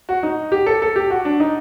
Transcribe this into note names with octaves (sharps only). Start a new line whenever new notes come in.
F#4
D#4
G4
A4
A4
G4
F#4
D4
D#4